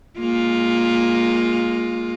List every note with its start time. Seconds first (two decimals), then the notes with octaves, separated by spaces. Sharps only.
0.19 G#3 A#3 F4